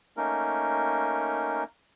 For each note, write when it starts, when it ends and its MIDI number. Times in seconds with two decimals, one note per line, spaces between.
0.17 1.64 57
0.17 1.64 58
0.17 1.64 61
0.17 1.64 63
0.17 1.64 70